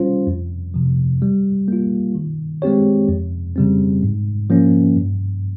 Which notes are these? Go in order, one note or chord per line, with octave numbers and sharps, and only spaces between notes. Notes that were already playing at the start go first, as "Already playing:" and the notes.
Already playing: G3 C#4 F4 C5
F2
C3 F3
G3
A#3 F4
D#3
G#3 C4 G4 C#5
F2
C#3 G3 C4
G#2
F3 A#3 C#4
G2